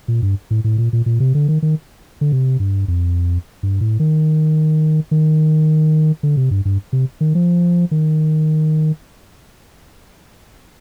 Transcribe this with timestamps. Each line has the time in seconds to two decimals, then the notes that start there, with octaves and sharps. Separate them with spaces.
0.08 A#2
0.22 G2
0.51 A2
0.64 A2
0.78 A#2
0.93 A#2
1.06 A#2
1.20 C3
1.35 D3
1.48 D#3
1.62 D#3
2.21 D3
2.32 C3
2.60 G2
2.88 F2
3.63 G2
3.81 A2
4.00 D#3
5.11 D#3
6.23 D3
6.37 C3
6.51 G2
6.65 G2
6.93 C3
7.21 D#3
7.35 F3
7.91 D#3